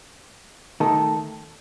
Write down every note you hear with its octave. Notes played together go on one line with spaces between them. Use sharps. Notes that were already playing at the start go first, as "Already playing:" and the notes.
D#3 A3 D#4 A4